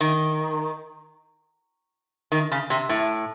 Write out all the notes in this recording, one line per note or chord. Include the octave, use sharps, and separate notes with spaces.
D#3
D#3
C#3
C3
A2